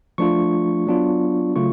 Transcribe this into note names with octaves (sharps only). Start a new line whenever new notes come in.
F3 A3 D4 F4 C#6
F#3 B3 D4 F4
C#3 F#3 A3 F4 C#6